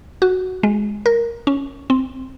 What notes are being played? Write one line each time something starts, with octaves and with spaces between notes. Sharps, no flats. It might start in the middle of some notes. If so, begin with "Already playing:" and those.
F#4
G#3
A#4
C#4
C4